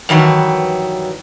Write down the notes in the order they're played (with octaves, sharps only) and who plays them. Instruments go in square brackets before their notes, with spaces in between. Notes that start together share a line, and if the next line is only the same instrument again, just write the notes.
[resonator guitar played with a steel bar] G2 D#3 E3 F#3